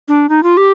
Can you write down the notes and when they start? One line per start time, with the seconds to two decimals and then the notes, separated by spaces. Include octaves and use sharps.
0.08 D4
0.29 D#4
0.43 F4
0.57 G4